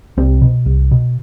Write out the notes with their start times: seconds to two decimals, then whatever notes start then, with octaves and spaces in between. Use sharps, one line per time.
0.17 C2 C4
0.42 B2
0.66 C2
0.91 B2